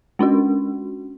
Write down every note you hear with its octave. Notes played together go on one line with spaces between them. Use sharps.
G#3 C#4 D4 F#4